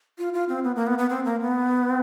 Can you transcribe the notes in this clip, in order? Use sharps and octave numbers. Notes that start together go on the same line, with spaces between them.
F4
F4
C4
B3
A#3
B3
B3
C4
A#3
B3